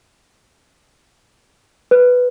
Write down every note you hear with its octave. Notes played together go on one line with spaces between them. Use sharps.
B4